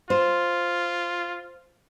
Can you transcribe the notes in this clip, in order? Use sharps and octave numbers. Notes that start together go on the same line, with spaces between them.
F4 C5